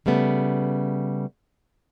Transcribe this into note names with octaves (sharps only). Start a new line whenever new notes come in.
C#3 G3 A3 B3